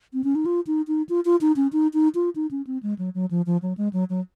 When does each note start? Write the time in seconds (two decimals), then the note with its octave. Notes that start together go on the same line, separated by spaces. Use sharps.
0.13 C4
0.24 C#4
0.35 D#4
0.46 F4
0.67 D#4
0.88 D#4
1.09 F4
1.25 F4
1.41 D#4
1.56 C#4
1.73 D#4
1.94 D#4
2.15 F4
2.36 D#4
2.51 C#4
2.67 C4
2.83 G#3
2.99 F#3
3.15 F#3
3.31 F3
3.46 F3
3.62 F#3
3.77 G#3
3.93 F#3
4.10 F#3